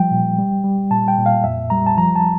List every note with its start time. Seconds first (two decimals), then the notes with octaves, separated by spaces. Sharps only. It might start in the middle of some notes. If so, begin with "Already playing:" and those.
Already playing: F3 G3 G5
0.11 A#2
0.38 G3
0.64 G3
0.90 A#2 A5
1.08 G5
1.18 A#2
1.26 F5
1.44 F2 E5
1.70 G3 A#5
1.86 A5
1.97 F3 A#5
2.16 A5